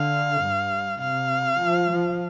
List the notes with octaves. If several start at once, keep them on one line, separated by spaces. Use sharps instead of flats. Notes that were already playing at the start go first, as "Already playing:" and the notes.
Already playing: D3 F5
G2
C3 F5
F3
F3